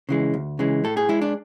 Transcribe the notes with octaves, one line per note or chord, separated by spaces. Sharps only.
C#3 E3 G#3
D2
C#3 E3 G#3
A2 A4
G#4
G#3 E4
D4